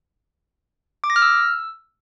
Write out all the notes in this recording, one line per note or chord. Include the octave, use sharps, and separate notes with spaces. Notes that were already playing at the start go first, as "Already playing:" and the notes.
D6
A#6
F6
E6